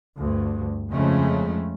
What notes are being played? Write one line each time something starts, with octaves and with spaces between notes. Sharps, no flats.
D2 G2
F2 C#3 G#3 A3